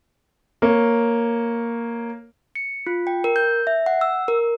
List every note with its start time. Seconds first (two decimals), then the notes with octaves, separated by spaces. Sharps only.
0.62 A#3 C#5
2.55 C#7
2.86 F4
3.07 G5
3.24 A#4
3.36 G6
3.67 E5
3.86 F#5
4.01 E6
4.28 A#4